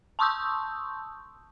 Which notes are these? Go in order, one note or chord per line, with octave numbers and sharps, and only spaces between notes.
A5 C6 C#6 D#6 E6 G6